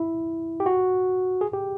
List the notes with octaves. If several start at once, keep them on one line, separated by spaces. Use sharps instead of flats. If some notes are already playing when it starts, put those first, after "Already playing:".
Already playing: E4
G4
F#4
G#4
G4